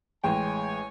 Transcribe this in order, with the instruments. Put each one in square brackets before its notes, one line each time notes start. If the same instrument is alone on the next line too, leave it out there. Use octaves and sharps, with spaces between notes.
[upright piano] A1 G#3 G5 [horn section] C#5 G#5